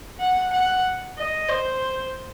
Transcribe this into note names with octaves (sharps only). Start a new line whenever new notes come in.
F#5
F#5
D#5
C5